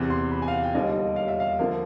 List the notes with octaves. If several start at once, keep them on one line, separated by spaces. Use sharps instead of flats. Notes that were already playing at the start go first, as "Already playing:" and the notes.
Already playing: E2 C3 E3
C6
B5
G#5
F5
F#5
G5
E1 D#2 D3 G3 D#5
D#5
F5
E5
F5
D3 F3 A#3